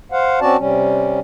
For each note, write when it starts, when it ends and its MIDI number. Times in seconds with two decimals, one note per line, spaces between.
0.12 0.40 72
0.12 0.40 77
0.12 0.40 78
0.41 0.57 60
0.41 0.57 61
0.41 0.57 66
0.41 0.57 74
0.41 0.57 81
0.58 1.20 48
0.58 1.20 55
0.58 1.20 61